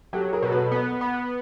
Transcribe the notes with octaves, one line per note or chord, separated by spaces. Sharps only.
F#3 G4 A4
G#4 A#4
B2
A4 B4
B3
B3